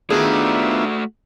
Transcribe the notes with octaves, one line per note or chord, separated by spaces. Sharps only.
D#3 A3 B3 D4 F4 F#4 G#4 E5